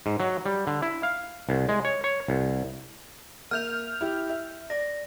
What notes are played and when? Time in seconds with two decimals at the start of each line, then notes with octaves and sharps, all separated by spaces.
0.06 G#2
0.20 F#3
0.46 G3
0.67 D3
0.82 E4
1.03 F5
1.49 C2
1.69 G#3
1.85 C#5
2.04 C#5
2.28 C2
3.51 A#3 E5 F6 G6 F7
4.01 E4 G4
4.30 E5
4.70 D5 A#6